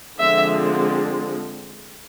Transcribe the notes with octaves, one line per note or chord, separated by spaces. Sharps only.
D3 F3 G#3 C4 E5